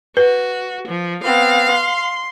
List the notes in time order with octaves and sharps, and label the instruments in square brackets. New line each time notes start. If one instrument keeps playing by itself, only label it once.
[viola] F#4 [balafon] B4
[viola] F3
[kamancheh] B3 C4 [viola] F5
[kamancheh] C6